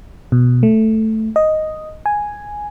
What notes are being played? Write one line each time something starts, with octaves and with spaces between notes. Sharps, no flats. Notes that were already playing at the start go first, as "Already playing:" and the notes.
B2
A3
D#5
G#5